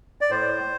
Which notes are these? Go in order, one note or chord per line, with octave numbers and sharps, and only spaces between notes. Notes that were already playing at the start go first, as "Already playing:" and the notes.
D5
A2 C5